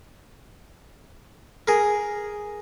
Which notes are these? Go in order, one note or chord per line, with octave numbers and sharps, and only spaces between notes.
G#4 A#4